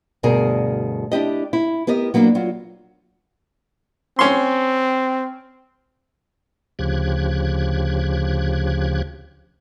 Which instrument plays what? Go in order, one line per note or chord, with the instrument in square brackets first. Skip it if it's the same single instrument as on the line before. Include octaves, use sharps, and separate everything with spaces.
[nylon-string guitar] D2 G2 B2 G#4 A#4
D4 E4 G4 D#5
E4
B3 G4 A#4 D#5
F#3 A#3 B3 D4
F#3 F4
[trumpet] C4 [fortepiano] C#4 C6
[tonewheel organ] D2 C#3 F3 G4 F#6 G#6